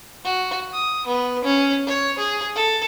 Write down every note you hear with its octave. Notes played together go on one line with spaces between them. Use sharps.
F#4
D#6
B3
C#4
C#5
G#4
A4